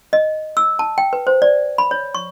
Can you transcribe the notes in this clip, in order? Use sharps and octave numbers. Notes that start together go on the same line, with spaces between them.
D#5
E6
A5
G5
B4
C5
D5
B5
C#5
C#6